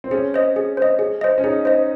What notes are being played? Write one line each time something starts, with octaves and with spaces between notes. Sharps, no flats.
C4
C#4 G#4
C5 D#5
G#4
C5 D#5
G#4
C5 D#5
C#4
D#4 G#4
C5 D#5